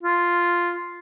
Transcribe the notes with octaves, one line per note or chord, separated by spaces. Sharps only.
F4